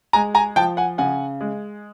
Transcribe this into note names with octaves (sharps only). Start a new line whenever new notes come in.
G#3 G#5 A#5
G#5 A#5
F3 G5 A5
F#5 G#5
C#3 F#5 G#5
G#3